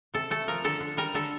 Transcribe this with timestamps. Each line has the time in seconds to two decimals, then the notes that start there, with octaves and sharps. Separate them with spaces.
0.14 C3 A4
0.30 A3 A4
0.48 F3 A#4
0.64 D3 A4
0.80 D3
0.97 G3 A#4
1.14 D3 A4